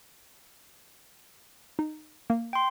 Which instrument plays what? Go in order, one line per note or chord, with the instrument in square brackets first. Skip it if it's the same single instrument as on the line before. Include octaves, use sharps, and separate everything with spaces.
[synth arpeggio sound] D#4
A#3
[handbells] G5 C6